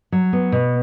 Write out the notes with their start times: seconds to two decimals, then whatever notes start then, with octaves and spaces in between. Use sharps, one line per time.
0.12 F#3
0.33 B3
0.52 B2